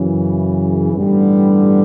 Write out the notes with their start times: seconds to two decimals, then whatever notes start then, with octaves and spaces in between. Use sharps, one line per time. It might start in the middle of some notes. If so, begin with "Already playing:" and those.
Already playing: F#2 C#3 E3
0.93 A1 G2 D3 G3 B3